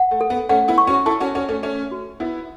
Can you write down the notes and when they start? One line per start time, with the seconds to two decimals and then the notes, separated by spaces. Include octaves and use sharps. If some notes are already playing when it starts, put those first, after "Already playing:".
Already playing: F#5
0.11 A3
0.21 A4
0.30 B3
0.49 A3 C#4 F#5
0.68 B3 E4
0.78 C#6
0.87 C#4 F#4
1.06 E4 A4 A5
1.20 C#4 F#4
1.35 C#4 F#4 A4
1.49 A3 C#4
1.63 A3 C#4 E5
1.91 F#4
2.20 B3 E4 E5